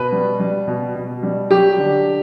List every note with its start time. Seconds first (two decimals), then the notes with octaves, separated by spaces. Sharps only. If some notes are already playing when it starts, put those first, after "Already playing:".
Already playing: B2 B4
0.12 G3
0.40 G3
0.68 B2
0.95 B2
1.23 G3
1.50 F#3 G4
1.78 D3